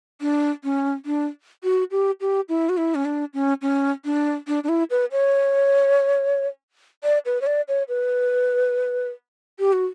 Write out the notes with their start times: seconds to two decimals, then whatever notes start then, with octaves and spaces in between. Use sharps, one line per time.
0.21 D4
0.64 C#4
1.06 D4
1.64 F#4
1.91 G4
2.21 G4
2.49 E4
2.69 F#4
2.77 E4
2.95 C#4
3.05 D4
3.34 C#4
3.62 C#4
4.05 D4
4.48 D4
4.64 D4
4.69 E4
4.90 B4
5.12 C#5
7.04 D5
7.26 B4
7.42 C#5
7.47 D5
7.68 C#5
7.88 B4
9.59 G4
9.73 F#4